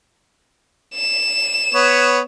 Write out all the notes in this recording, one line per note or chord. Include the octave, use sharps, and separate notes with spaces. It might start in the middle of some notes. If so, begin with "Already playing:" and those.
E7
B3 C#5